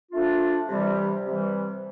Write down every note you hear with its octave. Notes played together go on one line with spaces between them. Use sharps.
F3 A3 D4 F4
C3 E3 G3
C3 E3 G3